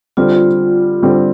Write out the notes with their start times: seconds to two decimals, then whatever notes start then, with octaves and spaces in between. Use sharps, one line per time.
0.17 D3 G3 C4 F4
1.02 D3 G3 C4